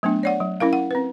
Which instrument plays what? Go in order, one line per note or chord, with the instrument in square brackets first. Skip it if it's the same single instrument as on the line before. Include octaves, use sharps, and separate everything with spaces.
[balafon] F#3 A3 B3 D4
C#5 D5 F#5
F#3
C#4 E4 A#4 F5
F#5
C4 B4